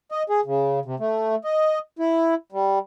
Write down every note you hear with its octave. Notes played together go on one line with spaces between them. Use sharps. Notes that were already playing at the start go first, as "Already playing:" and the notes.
D#5
G#4
C#3
C3
A3
D#5
E4
G3